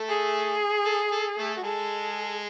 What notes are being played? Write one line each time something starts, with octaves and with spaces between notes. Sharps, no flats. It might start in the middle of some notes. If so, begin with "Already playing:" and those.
Already playing: A3 A4
G#4
A4
A4
A3 A4
F#4
G#3 G#4 A4